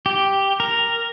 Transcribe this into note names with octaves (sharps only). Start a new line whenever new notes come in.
G4
A#4